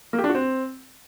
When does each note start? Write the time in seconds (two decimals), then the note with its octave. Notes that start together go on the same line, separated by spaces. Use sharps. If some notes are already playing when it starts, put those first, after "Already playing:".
0.13 A#3
0.19 G4
0.24 D4
0.29 F#4
0.35 C4